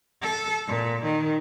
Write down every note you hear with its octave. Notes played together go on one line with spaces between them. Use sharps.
A4
A#2
D#3